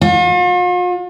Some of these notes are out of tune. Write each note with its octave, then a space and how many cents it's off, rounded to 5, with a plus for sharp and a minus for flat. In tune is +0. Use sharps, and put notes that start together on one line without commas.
F4 +45